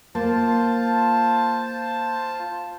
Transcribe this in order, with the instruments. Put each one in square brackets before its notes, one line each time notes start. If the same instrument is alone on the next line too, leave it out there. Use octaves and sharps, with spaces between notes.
[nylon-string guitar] A#3 [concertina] F4 C5 [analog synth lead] A5